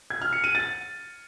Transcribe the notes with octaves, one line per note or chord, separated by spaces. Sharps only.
G#6
F6
C#7
D#7
A6